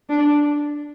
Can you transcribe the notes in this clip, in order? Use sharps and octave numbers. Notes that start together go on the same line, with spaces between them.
D4